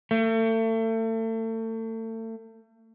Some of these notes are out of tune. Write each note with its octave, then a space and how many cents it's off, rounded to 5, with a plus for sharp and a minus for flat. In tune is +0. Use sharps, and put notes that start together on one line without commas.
A3 +35